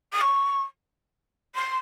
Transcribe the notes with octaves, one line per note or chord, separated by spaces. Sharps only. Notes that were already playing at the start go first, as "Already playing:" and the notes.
D#6
C#6
C6